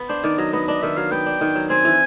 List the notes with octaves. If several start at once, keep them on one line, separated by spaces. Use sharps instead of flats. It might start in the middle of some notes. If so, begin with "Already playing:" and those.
Already playing: B3
D4 C5
D#3 D5
F#3 D#5
B3 D#5
D4 D#5
D#3 E5
F#3 F5
B3 G5
D4
D#3
F#3
C4 G#5
E3